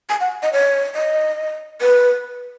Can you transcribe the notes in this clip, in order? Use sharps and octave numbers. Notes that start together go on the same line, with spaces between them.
G#5
F#5
D#5
C#5
D#5
B4